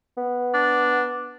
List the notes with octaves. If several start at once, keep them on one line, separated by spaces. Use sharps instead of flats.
B3
D4